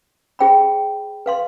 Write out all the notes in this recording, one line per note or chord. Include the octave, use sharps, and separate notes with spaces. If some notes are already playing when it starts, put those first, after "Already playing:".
F4 G#4 C5 G5 B5
B4 F5 C6